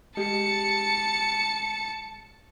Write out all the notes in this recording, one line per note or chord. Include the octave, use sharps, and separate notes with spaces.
G#3 G4 D#5 A5 C#7